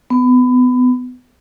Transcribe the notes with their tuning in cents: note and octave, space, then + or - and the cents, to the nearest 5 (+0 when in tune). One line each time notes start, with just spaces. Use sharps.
B3 +25